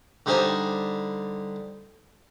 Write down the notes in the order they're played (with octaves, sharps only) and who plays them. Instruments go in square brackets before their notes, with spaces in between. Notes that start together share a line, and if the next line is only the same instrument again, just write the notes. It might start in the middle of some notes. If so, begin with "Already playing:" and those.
[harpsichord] D3 G3 D#4 C5 G#5